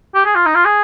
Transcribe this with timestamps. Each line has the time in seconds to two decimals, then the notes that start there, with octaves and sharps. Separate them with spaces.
0.15 G4
0.25 G#4
0.35 F4
0.46 D#4
0.55 F4
0.65 G#4